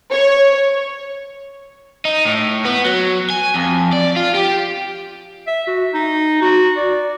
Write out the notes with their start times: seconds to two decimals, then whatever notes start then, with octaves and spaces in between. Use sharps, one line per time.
0.11 C#5
2.05 D#4
2.25 A2
2.65 B3
2.85 F#3
3.30 G#5
3.54 F2
3.93 D5
4.16 F4
4.35 G4
5.47 E5
5.67 F#4
5.94 D#4
6.42 F#4
6.77 D5